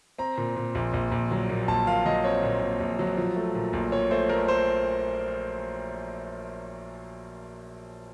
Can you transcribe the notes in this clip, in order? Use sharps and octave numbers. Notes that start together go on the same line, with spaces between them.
C4 A#5
A#2
A#2
A#1
A#1
A#1
F#3
A#2
A#1 A5
A#2 F5
F#3 D#5
C4 C#5
A#2
A#2
A#1
F#3
F3
A3
A#2
A#1
A#2 C#5
A3 C5
A3 A#4
C5